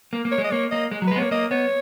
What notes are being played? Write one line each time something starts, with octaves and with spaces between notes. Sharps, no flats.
A#3
A#3
C#5
G#3
D#5
A#3 C#5
A#3 D#5
G#3
F#3
G#3 B4
B3
A#3 C#5
A#3 D#5
B3 C#5